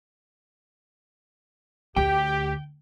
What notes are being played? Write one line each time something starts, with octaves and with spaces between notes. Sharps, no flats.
D2 G4 G5